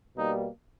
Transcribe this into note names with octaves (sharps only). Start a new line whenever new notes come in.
B2 G3 A#3 D#4